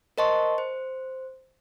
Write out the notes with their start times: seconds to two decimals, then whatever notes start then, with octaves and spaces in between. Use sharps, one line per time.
0.18 A#4 C5 D#5 A5 C6 C#6
0.58 C5